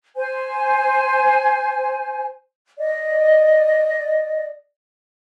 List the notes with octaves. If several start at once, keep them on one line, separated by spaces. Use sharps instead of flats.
C5 G#5
D5 D#5